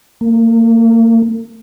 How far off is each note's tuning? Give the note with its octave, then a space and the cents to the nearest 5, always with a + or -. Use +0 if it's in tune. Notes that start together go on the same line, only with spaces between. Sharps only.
A#3 -35